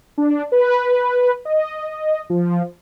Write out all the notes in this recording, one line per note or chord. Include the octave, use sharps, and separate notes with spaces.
D4
B4
D#5
F3